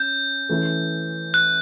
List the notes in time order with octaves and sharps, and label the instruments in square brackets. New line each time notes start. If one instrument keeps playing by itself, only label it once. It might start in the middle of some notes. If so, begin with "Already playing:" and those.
Already playing: [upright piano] C#4 [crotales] G6
[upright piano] E3 A3 C#4 E4
[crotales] F#6